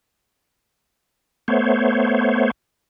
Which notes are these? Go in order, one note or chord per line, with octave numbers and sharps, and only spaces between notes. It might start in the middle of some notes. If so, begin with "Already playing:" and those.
A3 B3 C5 C#5